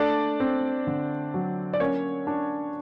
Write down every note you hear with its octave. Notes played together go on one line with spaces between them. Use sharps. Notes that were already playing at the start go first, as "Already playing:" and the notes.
Already playing: A3 D4 D5
C4
D3
F#3
D5
A#3 C#4 C#5
D4